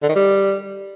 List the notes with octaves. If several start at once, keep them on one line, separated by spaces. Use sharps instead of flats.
D3
D#3
G3